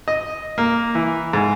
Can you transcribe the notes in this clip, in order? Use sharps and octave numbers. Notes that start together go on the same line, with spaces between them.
D#5
A#3
E3
G#2